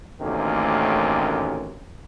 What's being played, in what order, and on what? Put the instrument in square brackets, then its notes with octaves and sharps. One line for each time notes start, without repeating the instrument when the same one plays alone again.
[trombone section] A1 D2 C3 D#3 A#3 C#4